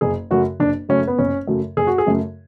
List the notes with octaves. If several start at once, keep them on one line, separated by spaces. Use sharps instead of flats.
F#1 G#4
F#2 C#3 F#3 A3 F#4
F#1 D4
F#2 C#3 F#3 A3 C#4
B3
F#1 C#4
F#2 C#3 F#3 A3
F#1 G#4
F#4
G#4
F#2 C#3 F#3 A3